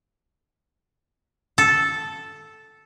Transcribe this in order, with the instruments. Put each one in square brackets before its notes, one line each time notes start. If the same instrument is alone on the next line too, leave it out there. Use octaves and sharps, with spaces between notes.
[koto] A4